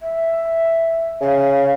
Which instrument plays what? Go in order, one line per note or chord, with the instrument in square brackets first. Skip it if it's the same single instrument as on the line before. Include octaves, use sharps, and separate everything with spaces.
[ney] E5
[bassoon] C#3 [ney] F5